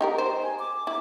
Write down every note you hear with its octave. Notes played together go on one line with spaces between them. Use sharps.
D#4 G4 A#4
C5
G#5
D6
E4 D6